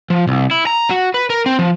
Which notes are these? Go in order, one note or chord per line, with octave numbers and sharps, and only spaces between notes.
F3
C2
E4
A#5
F#4
B4
A#4
C4
F3